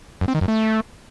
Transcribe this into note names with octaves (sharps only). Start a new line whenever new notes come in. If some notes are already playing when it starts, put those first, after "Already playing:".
F#2
C4
D#3
F#2
A3